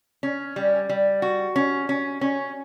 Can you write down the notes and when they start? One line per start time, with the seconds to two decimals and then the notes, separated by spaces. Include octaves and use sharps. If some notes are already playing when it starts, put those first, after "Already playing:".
0.23 C#4
0.56 G3
0.89 G3
1.22 F#4
1.56 C#4
1.89 C#4
2.21 C#4